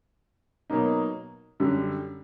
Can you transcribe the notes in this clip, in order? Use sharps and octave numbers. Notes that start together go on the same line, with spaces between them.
B2 F#3 A#3 D#4
F#2 D3 G3